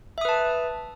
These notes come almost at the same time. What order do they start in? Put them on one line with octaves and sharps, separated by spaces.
E5 D#6 B4 A5